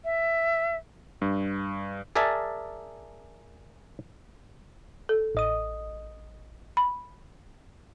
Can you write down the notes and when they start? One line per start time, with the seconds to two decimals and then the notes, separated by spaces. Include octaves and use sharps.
0.05 E5
1.22 G2
2.15 G#4 A#4 D5 E5 G#5 A5
5.09 A4
5.35 A1 D#5 D#6
6.77 B5